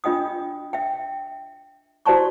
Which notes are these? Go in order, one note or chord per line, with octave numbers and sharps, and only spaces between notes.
D4 F4 D#5 G5 D#6
E5 G5
E4 F#4 C5 D5 A5 C#6